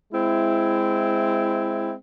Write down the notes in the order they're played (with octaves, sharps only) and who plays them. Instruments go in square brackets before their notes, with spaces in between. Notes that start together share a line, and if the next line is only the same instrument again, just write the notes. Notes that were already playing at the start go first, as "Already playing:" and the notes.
[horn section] G#3 C4 E4